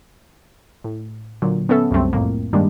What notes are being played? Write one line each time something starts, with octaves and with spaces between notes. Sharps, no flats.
A2
A#2 D3 F#3
B3 C#4 A4 E5
C2 F#2 G3 A3 C4
F2 A2 A#3
G2 D#3 G3 G#3 A#3 D4